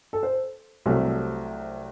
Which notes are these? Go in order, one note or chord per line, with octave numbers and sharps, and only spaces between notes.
A4
C5
C2 C3 F#3 A3